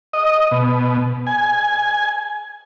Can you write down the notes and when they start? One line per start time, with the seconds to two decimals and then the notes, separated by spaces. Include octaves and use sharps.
0.13 D#5
0.51 B2
1.27 G#5